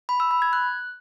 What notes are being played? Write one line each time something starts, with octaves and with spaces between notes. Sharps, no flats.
B5
E6
B5
G#6
F#6